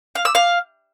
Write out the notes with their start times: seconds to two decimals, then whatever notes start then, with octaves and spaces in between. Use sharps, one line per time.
0.15 F5
0.25 E6
0.35 F5